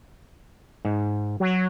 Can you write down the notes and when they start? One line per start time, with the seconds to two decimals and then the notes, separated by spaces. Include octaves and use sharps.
0.85 G#2
1.40 F#3